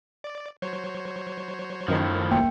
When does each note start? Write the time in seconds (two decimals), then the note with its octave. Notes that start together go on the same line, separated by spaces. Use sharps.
0.24 D5
0.62 F#3 C5 C#5
1.88 F#2 A2 D#3 F3
2.31 G1 C#2 G2 A#3 G5